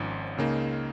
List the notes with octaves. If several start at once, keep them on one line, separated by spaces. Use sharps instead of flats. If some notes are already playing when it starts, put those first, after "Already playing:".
Already playing: G#1 G#2 F3 C#4
C#2 C#3 A#3 D#4